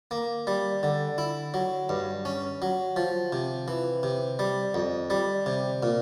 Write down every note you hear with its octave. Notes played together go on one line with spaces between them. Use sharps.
A#3
G3
D3
E4
F#3
G2
C#4
F#3
F3
C3
E3
C3
G3
F2
G3
C3
A#2